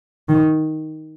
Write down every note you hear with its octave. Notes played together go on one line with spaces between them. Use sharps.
D#3